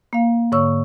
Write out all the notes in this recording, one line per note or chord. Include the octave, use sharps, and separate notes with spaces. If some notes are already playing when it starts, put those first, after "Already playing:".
A#3 F5
G#2 D3 C#5 C#6 E6